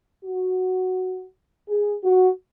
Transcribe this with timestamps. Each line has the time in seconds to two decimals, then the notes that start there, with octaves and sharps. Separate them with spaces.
0.24 F#4
1.68 G#4
2.04 F#4